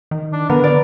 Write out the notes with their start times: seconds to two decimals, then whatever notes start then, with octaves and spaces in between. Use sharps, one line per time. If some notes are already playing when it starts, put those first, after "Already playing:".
0.11 D#3
0.33 D4
0.50 D3 B3 A#4
0.64 D5